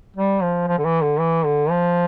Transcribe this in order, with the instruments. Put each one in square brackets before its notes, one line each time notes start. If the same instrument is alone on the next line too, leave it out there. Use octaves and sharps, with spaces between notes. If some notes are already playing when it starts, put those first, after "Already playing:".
[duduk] G3
F3
F3
D3
E3
D3
E3
D3
F3